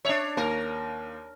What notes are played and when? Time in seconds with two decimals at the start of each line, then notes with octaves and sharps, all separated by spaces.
0.05 D4 C#5 E5 F7
0.37 D#2 A#3 A#4